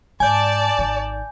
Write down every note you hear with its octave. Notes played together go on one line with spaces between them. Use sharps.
G#2 D5 G#5 A5 G6
G#1 D#4